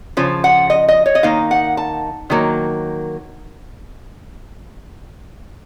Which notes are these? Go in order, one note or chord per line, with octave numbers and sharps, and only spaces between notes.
C#3 F3
F#5
D#5
D#5
C#5
D#5
D#3 A#3 D#4 F5
F#5
A5
D#3 F#3 A#3